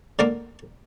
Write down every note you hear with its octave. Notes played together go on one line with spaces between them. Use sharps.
D3 A#3 A#4 D6